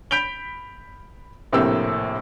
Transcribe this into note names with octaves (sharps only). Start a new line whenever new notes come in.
B5 G6 B6 D7 F7 G7
A#1 A2 C3 A#3 C4 E6